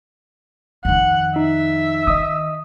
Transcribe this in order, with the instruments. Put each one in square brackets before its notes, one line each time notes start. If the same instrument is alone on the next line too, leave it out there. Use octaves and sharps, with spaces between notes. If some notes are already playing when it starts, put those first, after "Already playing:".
[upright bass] F2 D#3 [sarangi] F#5
[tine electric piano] D#4 [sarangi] E5
[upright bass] D#3 [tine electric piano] D#5 D#6